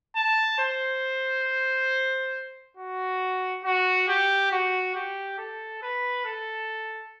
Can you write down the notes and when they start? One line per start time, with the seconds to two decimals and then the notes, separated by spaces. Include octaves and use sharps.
0.16 A5
0.59 C5
2.77 F#4
3.64 F#4
4.08 G4
4.52 F#4
4.96 G4
5.38 A4
5.83 B4
6.26 A4